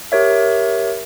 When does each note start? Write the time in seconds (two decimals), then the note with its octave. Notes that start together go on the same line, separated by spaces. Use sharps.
0.12 G4 A#4 C#5 E5